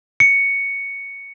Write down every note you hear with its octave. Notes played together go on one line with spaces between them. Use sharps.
C#7